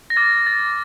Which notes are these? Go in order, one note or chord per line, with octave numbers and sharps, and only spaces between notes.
A#6
D6 F6 A6
A6